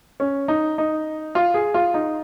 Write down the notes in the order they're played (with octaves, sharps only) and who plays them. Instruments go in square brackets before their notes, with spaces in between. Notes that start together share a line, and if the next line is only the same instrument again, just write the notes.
[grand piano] C#4
D#4
D#4
F4
G#4
F4
D#4